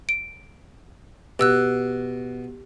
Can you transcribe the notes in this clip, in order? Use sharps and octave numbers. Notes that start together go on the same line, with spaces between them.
D7
B2 G4 E6 F#6